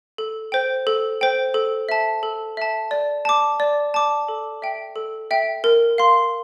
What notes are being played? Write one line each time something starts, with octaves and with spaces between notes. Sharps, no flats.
A4
C5 G5
A4
C5 G5
A4
E5 A5
A4
E5 A5
D5
A5 D6
D5
A5 D6
A4
E5 G5
A4
E5 G5
A#4
F5 C6